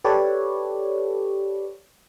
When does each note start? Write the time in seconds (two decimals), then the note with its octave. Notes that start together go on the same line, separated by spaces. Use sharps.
0.04 G4 A4 B4 C#5 D5